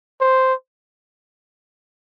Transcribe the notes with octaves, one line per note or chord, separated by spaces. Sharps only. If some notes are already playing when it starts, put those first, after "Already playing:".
C5